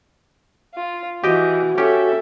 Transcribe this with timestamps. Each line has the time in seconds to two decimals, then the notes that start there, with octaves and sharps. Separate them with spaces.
0.74 F4
1.24 E3 F#4 G4 D#5 G5
1.78 C#4 G4 A4 E5